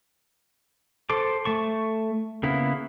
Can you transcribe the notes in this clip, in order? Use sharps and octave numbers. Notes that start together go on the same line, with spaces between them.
A4 C5 D6
A3 A5 C#6
C#3 A#3 B3 E4